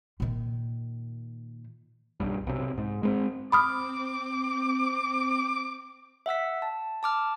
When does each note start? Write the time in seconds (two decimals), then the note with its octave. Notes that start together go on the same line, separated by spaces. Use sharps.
0.20 A#2 D#3
2.20 B1 G2
2.47 B1 C3
2.77 G#2
3.03 G#3 B3 C4
3.52 C4 B5 D6 D#6 F6
6.26 E5 F#5 E6 B6
6.62 A5
7.03 A5 D6 F6